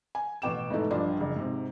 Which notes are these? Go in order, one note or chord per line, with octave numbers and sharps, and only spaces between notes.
G#5
A1 B2 G5 D6 E7
G#2 B2 E3 A3 D#4
A#1 G2 D4 F4 D#5
F#1
G#2 C3